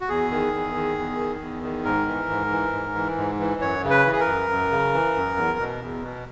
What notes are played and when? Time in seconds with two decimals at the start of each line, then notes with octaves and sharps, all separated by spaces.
0.01 F#4
0.09 E2 G#4
0.31 D#3
0.53 E2
0.75 D#3
0.98 E2
1.19 D#3
1.41 E2
1.63 D#3
1.85 G#2 A#4
2.07 E3
2.30 G#2
2.51 E3
2.73 G#2
2.95 E3
3.18 G#2
3.39 E3
3.61 F#2 C#5
3.84 C#3
3.90 B4
4.05 E3
4.13 G#4
4.20 A#4
4.27 F#2
4.50 F#2
4.71 C#3
4.94 E3
5.15 F#2
5.37 E2
5.59 B2
5.81 E2
6.03 B2